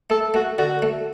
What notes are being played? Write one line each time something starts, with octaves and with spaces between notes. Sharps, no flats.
A3 A4
A3 F#4
D3 F#4
A3